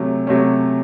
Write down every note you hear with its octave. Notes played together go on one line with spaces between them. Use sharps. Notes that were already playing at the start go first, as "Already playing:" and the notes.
Already playing: C3 F#3 A3 C#4
C3 F#3 A3 C#4